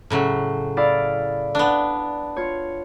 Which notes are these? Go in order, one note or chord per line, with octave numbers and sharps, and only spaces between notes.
A2 C#3 F#3
E4 D5 F5
B3 D4
F4 C#5